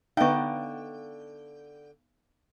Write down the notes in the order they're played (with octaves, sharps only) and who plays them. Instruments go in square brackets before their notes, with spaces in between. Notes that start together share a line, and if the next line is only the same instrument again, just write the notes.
[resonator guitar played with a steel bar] D3 G5 [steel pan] B3 D#4 [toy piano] F5 C#6